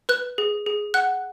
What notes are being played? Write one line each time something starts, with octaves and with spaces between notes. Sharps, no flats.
B4 F#6
G#4
G#4
F#5 F#6